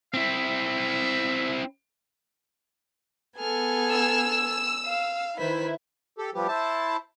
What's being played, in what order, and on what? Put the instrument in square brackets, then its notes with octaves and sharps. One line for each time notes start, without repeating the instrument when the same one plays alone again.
[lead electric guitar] C4 E4 [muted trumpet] E5
[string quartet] B3 A4 G#5 [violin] G#4 F6
[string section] E6
[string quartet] F5
[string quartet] D#3 B4 [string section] E4 [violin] C5 B6
[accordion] G4 A4
F3 G3 B3 G4
E4 C5 A5